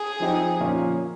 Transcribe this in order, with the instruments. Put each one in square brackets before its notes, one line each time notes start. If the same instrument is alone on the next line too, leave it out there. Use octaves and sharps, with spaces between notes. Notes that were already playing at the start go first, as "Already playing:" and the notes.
Already playing: [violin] G#4
[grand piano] F3 C4 D#4 G4
A#2 F3 A#3 C#4 F4